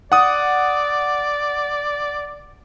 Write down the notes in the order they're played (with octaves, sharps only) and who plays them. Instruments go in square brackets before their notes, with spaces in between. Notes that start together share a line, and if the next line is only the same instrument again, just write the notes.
[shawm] D5 [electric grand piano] F#5 D#6